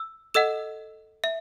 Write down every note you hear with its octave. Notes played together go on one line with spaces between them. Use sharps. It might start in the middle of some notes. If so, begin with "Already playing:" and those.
Already playing: E6
A4 D#5 F#5 E6 E7
E5